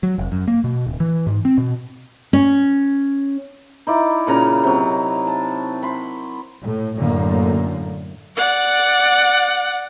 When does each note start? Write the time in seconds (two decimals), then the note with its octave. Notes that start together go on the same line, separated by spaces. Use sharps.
0.03 F#3
0.18 F1
0.32 F#2
0.48 A#3
0.64 B2
0.86 D1
1.00 E3
1.27 G#2
1.45 C4
1.58 B2
2.33 C#4
3.87 D#4 E4 D5
4.27 A#2 C#3 A#5
4.64 C3 F#3
5.27 A5
5.83 B5 C6
6.61 A2
6.98 F#2 A2 D3 A#3
8.37 D5 F#5